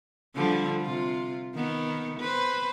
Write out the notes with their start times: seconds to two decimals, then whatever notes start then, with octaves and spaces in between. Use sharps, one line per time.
0.35 D3 F3 G3
0.81 C3 F4
1.55 D#3 B3
2.20 B4 C5